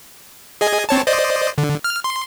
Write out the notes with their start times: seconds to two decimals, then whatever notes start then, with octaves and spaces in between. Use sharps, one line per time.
0.61 G#4 D#5 G#5
0.89 C4 C#5 A5
1.07 C5 D5 D#5
1.58 D3
1.84 F6
2.04 C6